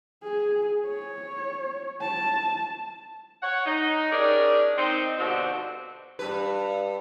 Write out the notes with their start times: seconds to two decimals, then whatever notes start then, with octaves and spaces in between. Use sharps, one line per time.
0.24 G#4
0.87 C#5
2.02 A5
3.43 C#5 F#5
3.66 D#4
4.12 C#4 D4 G4 G#4 A#4 D5
4.77 C4 D#4
5.19 G2 B2 D3 C4 F#4
6.19 G2 B4